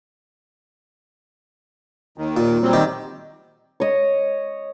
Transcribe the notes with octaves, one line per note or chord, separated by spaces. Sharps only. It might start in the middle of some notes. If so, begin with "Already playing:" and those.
D#2 D#3
A#2
F#3 G3 C4
D#3 G4
C#5 D#5